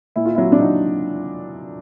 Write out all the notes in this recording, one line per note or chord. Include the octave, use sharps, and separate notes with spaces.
A#2 E4
F4
F#3 E4
D4
F#3 D#4